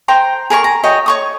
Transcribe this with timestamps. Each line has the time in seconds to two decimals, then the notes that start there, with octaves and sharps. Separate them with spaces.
0.08 C5 G5 A#5 C6
0.50 G#4 A#4 A#5 C#6
0.64 A#5
0.83 F#4 C#5 D#5 G5
1.06 C#5 C#6 D#6